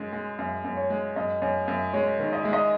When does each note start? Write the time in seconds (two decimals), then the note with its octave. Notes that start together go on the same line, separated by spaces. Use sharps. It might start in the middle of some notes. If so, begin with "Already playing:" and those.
Already playing: F#2 G#3
0.13 G#3
0.39 F#2 E5
0.64 F#2
0.77 C#5
0.90 G#3
1.16 F#2 D#5
1.41 F#2 C#5
1.68 F#2 E5
1.93 G#3 C#5
2.19 D#3
2.33 D#5
2.42 G#3 E5
2.53 D#5